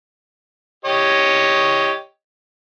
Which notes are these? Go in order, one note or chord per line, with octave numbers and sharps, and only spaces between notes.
G4 C#5 D#5